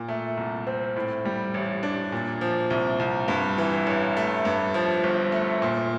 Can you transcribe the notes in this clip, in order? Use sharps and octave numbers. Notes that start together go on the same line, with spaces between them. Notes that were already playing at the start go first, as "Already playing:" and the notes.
Already playing: A#2
A3
C2
C4
A2
G3
A1
D4
A#2
F3
C2
C2
G2
E3
A1
A3
G2
F3
G1
A3
A#2